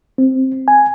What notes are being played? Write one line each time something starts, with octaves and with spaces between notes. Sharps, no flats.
C4
G#5